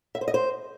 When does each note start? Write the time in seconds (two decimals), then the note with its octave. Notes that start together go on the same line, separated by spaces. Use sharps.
0.15 E5
0.21 C5
0.28 D#5
0.34 C5